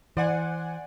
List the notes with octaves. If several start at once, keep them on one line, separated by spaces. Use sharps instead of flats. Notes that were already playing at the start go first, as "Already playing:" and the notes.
E3 C5 D5 F#5 G#5